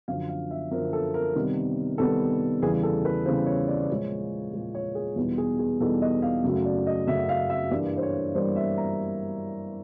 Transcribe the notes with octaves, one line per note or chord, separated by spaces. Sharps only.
F#2 D3 F3 F5
F5
E5
F#2 D3 F3 A#4
A4
A#4
C3 D#3 G3 B3
C3 D#3 G3 B3 A4
E2 C#3 E3 G3 G#4
A4
B4
E2 C#3 E3 G3 C5
C#5
D5
D5
A#2 F3 G#3 C#5
A#2 F3 G#3
C#5
G#4
E2 B2 G3 B3 D#4
G#4
G#4
E2 B2 G3 B3 D#4 A4
D#5
F5
F#2 C#3 F#3 A3
D5
D#5
F#2 C#3 F#3 A3 E5
F5
E5
G2 E3 G3 A#3 D4
C5
C#5
G2 E3 G3 A#3 D4 C5
E5
A#5